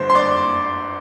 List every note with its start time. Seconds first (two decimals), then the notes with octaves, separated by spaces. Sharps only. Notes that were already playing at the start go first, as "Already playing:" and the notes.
Already playing: G1 G2 D3 A3 D4 C5
0.10 C6
0.15 D5 D6